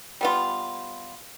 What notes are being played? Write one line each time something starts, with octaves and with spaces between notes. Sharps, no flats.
G3 B3 F4